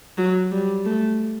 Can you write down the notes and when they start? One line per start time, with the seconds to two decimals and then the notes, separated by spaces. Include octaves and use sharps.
0.18 F#3
0.52 G3
0.86 A3